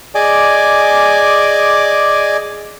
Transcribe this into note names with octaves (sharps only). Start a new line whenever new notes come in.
G#4 D5 D#5 G#5 D6